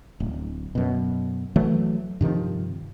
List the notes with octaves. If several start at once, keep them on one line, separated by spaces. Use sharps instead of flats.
D1
F#2 B2
E3 F#3 A3
G2 C3 D#3 F3